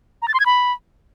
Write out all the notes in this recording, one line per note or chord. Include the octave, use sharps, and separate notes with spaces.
A#5
A6
C6
G#6
B5